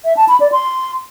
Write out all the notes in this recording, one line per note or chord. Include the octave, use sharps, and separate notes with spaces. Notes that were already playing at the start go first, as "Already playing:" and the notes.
E5
A5
B5
D5
C6